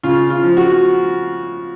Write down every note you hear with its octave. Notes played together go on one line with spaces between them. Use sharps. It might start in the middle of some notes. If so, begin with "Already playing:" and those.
C#3 F4
F4
F3
F#4